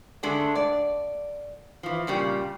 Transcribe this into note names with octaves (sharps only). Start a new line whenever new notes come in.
D3 G#3 A3 D4
D5
E3 F3
A#2 C#3 G3